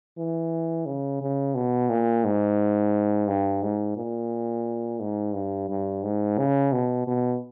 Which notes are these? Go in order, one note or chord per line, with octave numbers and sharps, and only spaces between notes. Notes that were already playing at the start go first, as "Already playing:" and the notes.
E3
C#3
C#3
B2
A#2
G#2
G2
G#2
A#2
G#2
G2
G2
G#2
C#3
B2
B2